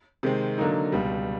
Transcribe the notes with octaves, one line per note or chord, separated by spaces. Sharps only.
C3 D#3 G#3 C4
D3 F#3 A#3 D#4
C#2 B2 G3